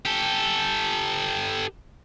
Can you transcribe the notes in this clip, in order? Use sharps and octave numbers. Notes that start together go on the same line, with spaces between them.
G4 A4